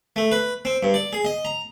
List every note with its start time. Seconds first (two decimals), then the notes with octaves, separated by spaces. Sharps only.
0.16 A3
0.32 B4
0.65 C4
0.83 G2
0.94 D5
1.13 G#4
1.25 D#5
1.45 A#5